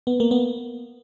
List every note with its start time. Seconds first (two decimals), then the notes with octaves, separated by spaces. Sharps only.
0.07 B3
0.20 A#3
0.31 B3